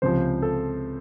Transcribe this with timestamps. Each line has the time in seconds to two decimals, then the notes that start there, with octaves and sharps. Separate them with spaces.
0.02 C#2 C3 F3 C5
0.42 A4